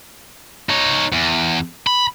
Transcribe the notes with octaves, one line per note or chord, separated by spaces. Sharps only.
D#4 C#5
E2
B5